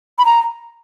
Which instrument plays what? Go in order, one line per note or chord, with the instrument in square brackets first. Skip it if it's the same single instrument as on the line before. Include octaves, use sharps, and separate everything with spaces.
[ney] B5
A#5